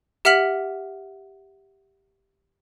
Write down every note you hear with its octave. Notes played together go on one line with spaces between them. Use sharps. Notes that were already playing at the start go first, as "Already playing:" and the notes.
G4 E5 F#5 F6 B6 F#7